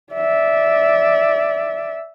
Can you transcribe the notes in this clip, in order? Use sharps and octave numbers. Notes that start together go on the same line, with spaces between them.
D5 E5